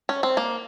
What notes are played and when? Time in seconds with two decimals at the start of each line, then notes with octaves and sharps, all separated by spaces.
0.09 C#4
0.23 C4
0.37 A#3